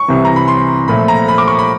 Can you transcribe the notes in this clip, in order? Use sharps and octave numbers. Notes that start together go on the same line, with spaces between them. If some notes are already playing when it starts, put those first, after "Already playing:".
Already playing: C#6
C2 C3 E3
A#5
B5
C6
A#2 F3 A3 B5
A#5
B5
D6
C#6
B5